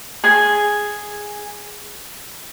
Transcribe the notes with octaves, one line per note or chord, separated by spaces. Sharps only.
G#4 G#5